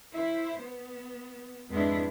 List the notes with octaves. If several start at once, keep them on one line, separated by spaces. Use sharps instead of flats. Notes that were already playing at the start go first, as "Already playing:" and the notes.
E4 C5
B3
F2 G#2 G#3 B3 D4 E4